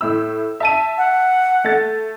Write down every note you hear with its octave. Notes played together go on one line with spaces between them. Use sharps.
A2 E4 E6
E5 A5 D#7
F#5
A3 A6